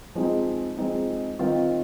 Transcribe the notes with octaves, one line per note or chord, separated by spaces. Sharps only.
F3 G#3 C4 D#4
F3 G#3 C4 D#4
D#3 C4 F4